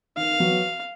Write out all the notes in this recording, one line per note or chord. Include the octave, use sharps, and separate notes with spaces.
D#3 F5
F#3 B3 F#4